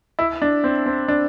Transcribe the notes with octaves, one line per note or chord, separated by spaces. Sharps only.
E4
D4
C4
C4
D4